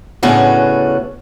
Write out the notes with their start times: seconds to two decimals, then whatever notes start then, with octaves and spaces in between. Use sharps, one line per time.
0.23 A2 C#3 B3 C#4 D4 F#4